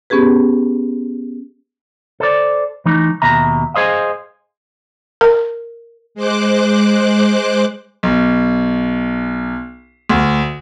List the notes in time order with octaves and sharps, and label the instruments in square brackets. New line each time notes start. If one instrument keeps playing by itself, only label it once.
[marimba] B3 C#4 G4 G#4 B4
[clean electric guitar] A4 C5 D5
E3 A3 D#4
D#2 B2 E5 A#5
G#4 C5 D#5 F5
[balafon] A#4
[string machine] G#3 C5 D6 F#6
[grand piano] B1
D2